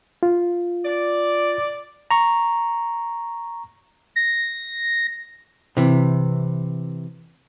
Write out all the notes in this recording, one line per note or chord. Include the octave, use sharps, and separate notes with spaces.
F4
D5
A#5 C#6
A#6
C3 E3